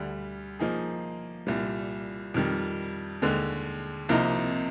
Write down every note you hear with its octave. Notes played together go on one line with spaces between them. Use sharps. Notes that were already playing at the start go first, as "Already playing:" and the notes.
Already playing: D2 D3 G3
F3 A#3 D#4 G#4
C2 A#2 G3
F2 D#3 G3
D#2 D3 G#3
C2 C3 F3 A#3 D#4